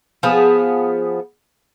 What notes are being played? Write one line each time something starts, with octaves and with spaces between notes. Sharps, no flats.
F3 B3 G#4